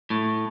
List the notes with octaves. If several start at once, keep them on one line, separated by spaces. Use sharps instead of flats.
A2